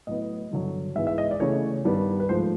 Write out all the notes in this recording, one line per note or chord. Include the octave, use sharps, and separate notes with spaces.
A2 F#3 B3 D#5
G2 D3 F#3
G#2 E3 G#3 B3 E5
E5
D#5
D5
C#3 E3 A3 C#5
G2 D#3 G3 B3
B4
G#2 F3 A3 C5